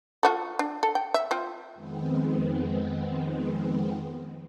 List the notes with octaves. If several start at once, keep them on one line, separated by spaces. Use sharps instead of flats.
F4 F#4 A4
D4
A4
G5
E5
C4 F4
F2 D#3 G#3 B3 C4